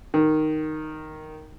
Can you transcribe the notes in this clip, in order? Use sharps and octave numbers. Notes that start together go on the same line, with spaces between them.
D#3